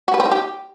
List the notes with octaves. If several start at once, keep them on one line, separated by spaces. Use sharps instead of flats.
F#4
B4
C4
D#4
G4